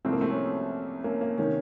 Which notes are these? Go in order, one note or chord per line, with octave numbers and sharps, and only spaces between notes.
C2 C3 F3 A3 C4
A#3
A3 C4
A#3 C#4
A#3 C#4
A#3
C3 D#3 A#3 C#4